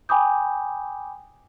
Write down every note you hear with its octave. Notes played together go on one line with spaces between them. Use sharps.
G5 G#5 B5 D6 D#6 G6